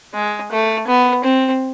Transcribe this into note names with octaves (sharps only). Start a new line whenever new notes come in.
G#3
A3
B3
C4